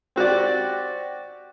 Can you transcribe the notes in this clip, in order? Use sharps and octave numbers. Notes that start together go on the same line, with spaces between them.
C4 F#4 G4 D5